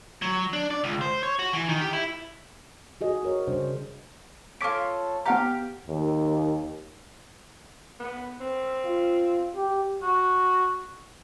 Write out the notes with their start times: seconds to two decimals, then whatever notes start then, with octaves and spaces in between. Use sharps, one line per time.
0.22 F#3
0.53 D4
0.71 D5
0.84 C#2
1.01 C5
1.23 C#5
1.39 F#4
1.53 E3
1.69 D#3
1.81 G4
1.93 E4
3.01 F#4 G#4 D#5
3.23 F#4 A#4 C#5
3.47 C#3 G3 D4 C5
4.61 F4 A4 C#5 D6 B6 D7
5.26 B3 G4 F5 F#5 A#5
5.87 D#2
8.00 B3
8.40 C4
8.85 F4
9.55 G4
10.02 F#4